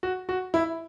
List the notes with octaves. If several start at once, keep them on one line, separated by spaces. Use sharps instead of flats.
F#4
F#4
E4